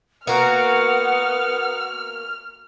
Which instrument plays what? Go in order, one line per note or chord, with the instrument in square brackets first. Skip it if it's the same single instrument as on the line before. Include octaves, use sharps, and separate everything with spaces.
[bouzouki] A#3 F#4 [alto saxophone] B3 [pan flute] F#5 [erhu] F6